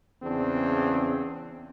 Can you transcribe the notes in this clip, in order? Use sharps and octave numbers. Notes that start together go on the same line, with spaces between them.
E2 C#3 C4 D4